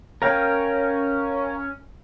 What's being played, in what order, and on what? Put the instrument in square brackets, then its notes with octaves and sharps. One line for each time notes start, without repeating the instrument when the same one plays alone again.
[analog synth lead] C#4 [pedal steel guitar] A#4 F5 G5